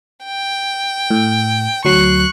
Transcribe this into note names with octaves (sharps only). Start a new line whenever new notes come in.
G5
A2
D2 F#3 C#6 F#6 C7